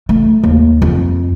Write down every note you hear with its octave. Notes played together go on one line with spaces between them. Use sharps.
A3
D#2
F2